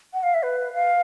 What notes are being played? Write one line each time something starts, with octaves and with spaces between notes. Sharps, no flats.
F#5
F5
E5
B4
F5